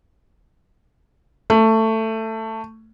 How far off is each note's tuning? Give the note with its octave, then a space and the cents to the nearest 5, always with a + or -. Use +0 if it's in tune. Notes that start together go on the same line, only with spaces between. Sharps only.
A3 +15